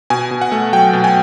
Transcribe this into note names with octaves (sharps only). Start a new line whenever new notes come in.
B2 G#5
B2
F#5
A3
F#3 G5
B2
G#5